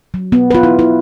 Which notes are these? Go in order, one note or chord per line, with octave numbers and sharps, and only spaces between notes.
F#3
B3
F4 B4
E4
E4